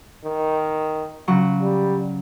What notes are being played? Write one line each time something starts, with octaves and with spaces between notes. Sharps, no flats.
D#3
C#3 F#3 C#6
G3